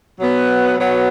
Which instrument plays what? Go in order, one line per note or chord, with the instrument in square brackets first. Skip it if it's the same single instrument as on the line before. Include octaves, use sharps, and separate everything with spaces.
[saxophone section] B2 F#3 B3
B2 F#3 B3